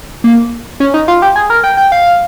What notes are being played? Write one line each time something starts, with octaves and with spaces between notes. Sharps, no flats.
A#3
C#4
D#4
F4
G4
G#4
A#4
G5
G5
F5